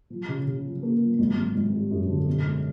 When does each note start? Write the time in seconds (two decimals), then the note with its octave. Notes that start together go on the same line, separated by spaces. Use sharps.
0.10 F3
0.28 C#3
0.46 C#3
0.65 F3
0.83 A#3
1.00 F3
1.19 G#1
1.36 G#1
1.55 G#1
1.73 G3
1.91 F#2
2.08 D3
2.27 B2
2.45 G#3